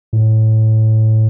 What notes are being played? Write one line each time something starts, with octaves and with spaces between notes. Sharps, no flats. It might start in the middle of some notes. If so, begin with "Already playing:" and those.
A2